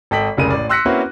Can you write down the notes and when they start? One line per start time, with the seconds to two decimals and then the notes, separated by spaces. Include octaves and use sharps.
0.11 G#1 A4 D#5 G5 B6 F#7
0.37 F1 C2 C#3 G#3 A#4 D#7
0.51 A1 D5
0.69 C6 E6 F#6 A#6 B6 C#7
0.85 A#3 C4 C#4 E4 F#4 B4